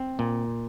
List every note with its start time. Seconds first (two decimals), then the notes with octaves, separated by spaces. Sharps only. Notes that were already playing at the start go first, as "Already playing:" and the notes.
Already playing: C4
0.19 A#2